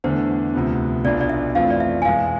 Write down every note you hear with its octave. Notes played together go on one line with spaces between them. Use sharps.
E2 D3 A3 D4 C5
D2 C3 F3 B3
B1 B2 B3 D4 F4 D5
D5
E5
F2 E3 A3 C4 F4 F5
D5
E5
G#5
E2 B2 G#3 F5